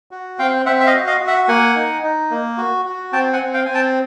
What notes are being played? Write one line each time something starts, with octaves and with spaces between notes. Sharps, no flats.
F#4
C4 F5 G5
C4 E5 F#5
E5
D#5 F5
F#4
D#5 F5
F#4
E5 F#5
A#3 F#5 G#5
D#4
D#4
A#3
F#4
F#4
C4 G5 A5
F#5 G#5
C4
F5 G5
C4 G#5
G5 A5